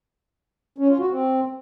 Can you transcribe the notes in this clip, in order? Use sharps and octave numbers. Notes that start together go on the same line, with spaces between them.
C#4
F4
F#4
C4